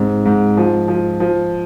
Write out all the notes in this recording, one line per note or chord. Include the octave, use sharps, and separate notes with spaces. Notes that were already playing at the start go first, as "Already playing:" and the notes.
Already playing: G#2 C3 C4
G#2
F3
F3
F3